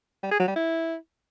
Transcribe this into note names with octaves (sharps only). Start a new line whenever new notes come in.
G3
G#4
F#3
G3
E4